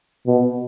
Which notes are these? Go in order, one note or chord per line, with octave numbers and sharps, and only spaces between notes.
B2